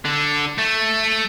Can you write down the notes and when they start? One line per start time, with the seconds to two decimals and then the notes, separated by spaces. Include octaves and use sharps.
0.05 D3
0.59 A3